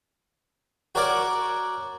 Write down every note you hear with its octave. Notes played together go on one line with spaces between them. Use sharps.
F#4 A#4 C#5 D5 D6